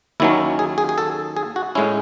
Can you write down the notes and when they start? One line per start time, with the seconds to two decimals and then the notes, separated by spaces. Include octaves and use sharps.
0.20 D#2 D#3 F#3 C#4 E4
0.59 G#4
0.78 G#4
0.89 G#4
0.98 A4
1.37 G#4
1.56 F#4
1.75 A2 G#3 C#4 E4